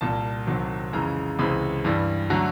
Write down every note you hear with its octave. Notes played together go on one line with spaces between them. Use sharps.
C2 A#2 G3 A5
C2 C3 D#3 F#3
F2 C#3 E3 G#3 A#5
C#2 C3 E3 G#3 B5
G2 E3 G3
D3 F#3 A3 A#5